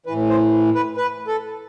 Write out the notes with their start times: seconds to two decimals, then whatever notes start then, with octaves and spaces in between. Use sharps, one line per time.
0.06 E3 B4
0.11 A2
0.30 C5
0.75 B4
0.97 B4
1.27 A4